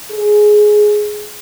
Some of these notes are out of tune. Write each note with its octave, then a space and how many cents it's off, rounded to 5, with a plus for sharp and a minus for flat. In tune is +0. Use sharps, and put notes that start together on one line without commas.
G#4 +10